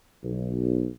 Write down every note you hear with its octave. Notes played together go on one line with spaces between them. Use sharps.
B1